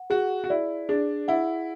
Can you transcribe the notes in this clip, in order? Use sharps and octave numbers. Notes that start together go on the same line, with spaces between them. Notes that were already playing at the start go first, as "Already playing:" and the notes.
Already playing: F#5
F#4 G#4
F#4
E4 D5
D4 G#4
E4 F#5